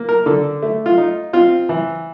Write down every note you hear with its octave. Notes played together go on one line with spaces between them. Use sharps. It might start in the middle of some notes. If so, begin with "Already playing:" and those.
Already playing: A#3
A#4
D3 A4
A3
F4
D#4
C4 F4
E3